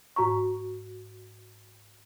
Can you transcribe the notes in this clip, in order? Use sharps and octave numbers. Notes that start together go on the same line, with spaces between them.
G#2 F#4 A#5 C#6